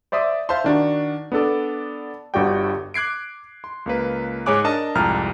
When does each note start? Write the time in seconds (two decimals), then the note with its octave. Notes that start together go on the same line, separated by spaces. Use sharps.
0.12 C5 D5 E5 C6 D#6
0.49 C5 E5 F5 A5 C6
0.64 D#3 D4 F#4
1.32 B3 D4 A4 D5
2.34 G1 G2 F#4 G4 D5 G5
2.94 D6 F#6 G#6 C7 D7
3.64 C6
3.86 C#2 A#3 B4
4.46 G#2 G#4 C#5 G#5 D6 F#6
4.64 D4 A#4 D#5 A5 D#6
4.95 C2 F2 G#2 A#5 F6